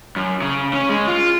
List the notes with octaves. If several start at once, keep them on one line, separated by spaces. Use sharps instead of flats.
F#2
C#3
C#4
G#3
F4